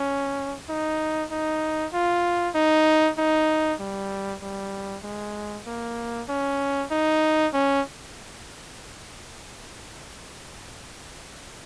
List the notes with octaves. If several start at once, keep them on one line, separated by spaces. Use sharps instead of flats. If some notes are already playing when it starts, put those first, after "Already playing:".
Already playing: C#4
D#4
D#4
F4
D#4
D#4
G3
G3
G#3
A#3
C#4
D#4
C#4